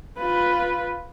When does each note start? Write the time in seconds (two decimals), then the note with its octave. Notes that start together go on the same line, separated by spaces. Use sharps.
0.18 F4 B4